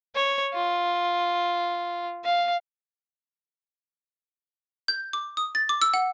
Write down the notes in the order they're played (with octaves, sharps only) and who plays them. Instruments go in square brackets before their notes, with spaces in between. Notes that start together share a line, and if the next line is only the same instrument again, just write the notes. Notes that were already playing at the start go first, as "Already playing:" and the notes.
[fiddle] C#5
F4
F5
[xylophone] G6
D6
D#6
A6
D6
E6
F#5